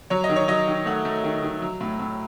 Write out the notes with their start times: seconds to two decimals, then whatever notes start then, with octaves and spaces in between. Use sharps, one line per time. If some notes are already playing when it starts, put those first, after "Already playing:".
0.10 F#3 C#5
0.24 D#5
0.29 D#3
0.36 C#5
0.48 F#3 D#5
0.68 D#3
0.86 A3 F#5
1.05 A3
1.24 D#3
1.43 D#3
1.62 F#3
1.81 A2
1.99 A2